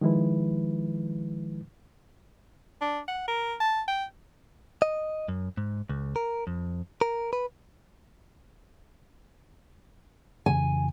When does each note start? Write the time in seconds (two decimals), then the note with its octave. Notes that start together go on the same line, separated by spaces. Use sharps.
0.01 D#3 F3 G#3 E4 B4
2.81 D4
3.08 F#5
3.28 A#4
3.60 A5
3.88 G5
4.82 D#5
5.28 F#2
5.57 G#2
5.89 C#2
6.16 A#4
6.47 F2
7.01 A#4
7.33 B4
10.46 F2 C#3 E3 G#5